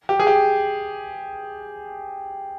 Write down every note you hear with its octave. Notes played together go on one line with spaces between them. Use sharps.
G4
G#4
G4